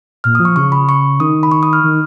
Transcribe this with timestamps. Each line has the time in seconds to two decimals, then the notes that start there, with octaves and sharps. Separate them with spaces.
0.24 A#2 F6
0.35 F3 D#6
0.45 C#6
0.56 C#3 C#6
0.72 B5
0.89 C#6
1.20 D#3 D#6
1.43 B5
1.52 C#6
1.63 D#6
1.73 F6
1.84 D#3